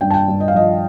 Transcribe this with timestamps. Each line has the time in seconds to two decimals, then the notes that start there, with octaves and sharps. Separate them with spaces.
0.01 G2 G5
0.10 A5
0.14 G5
0.28 G2
0.40 D#5
0.48 F5
0.54 F3 D#5